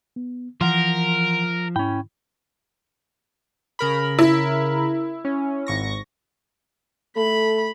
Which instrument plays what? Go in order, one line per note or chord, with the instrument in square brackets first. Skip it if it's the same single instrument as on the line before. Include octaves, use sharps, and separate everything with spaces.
[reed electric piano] B3
[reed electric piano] E3 F#5 C6 [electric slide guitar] F3 [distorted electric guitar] A#4
[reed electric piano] G#2 E4 B5 [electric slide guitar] C#4 G5
[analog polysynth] C#3 A#4 B5
[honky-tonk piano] E4
[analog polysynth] C#4
G#1 C#6 A#6
[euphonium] A3 [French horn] A4 [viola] B5